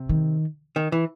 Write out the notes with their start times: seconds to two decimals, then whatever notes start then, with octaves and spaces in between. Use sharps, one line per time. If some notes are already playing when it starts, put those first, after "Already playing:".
Already playing: C3
0.09 D#3
0.76 D#3
0.92 E3